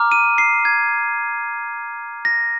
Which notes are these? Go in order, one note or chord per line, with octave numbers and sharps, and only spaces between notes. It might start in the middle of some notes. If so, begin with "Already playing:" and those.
Already playing: A#5 D6 F6
D#7
C7
G#6
A#6